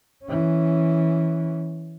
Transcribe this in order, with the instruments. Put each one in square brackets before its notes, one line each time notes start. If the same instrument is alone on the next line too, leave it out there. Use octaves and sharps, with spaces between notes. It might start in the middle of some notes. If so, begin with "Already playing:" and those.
[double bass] E3 C#4